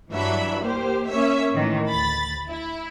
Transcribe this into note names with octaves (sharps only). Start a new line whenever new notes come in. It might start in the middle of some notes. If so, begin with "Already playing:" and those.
G2 E3 F#3 D4 E5 B5
A#3 G4 C5
A#3 C#4 E5
A2 D#3 E3
D2 B5 A6
E4